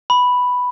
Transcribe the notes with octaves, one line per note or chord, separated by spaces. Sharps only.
B5